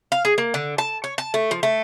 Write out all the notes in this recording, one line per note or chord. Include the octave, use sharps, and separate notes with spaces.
F5
G#4
A#3
D3
A5
C#5
A5
A3
F3
A3